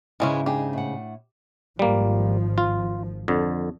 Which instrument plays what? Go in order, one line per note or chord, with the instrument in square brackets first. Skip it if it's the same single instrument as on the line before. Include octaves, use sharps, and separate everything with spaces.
[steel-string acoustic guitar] G#2 C#3 [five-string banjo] E3 G#3 C#4 [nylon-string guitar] E4
[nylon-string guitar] D4 D#4 G#4 [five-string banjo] G4
[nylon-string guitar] A2 F#5
[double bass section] G#1 F3 [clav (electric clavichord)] G3 A#3
[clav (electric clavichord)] F4
F2 D3